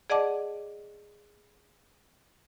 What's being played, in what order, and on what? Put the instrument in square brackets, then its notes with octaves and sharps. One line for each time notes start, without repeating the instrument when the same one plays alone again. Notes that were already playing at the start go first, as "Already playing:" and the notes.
[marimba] G#4 D5 D#5 F#5 A5 D6